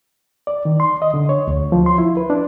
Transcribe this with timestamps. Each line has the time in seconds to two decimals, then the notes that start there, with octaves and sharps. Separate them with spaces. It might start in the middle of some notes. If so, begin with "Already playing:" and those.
0.47 D5
0.65 D#3
0.80 C6
1.02 D#5
1.14 D3
1.29 C#5
1.48 D2
1.72 F3
1.86 C6
1.98 E4
2.17 B4
2.30 D4